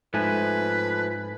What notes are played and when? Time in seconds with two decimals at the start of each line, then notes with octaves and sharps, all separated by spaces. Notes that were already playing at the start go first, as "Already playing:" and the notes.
0.14 G#2 F3 A3 B4 G#5 F#6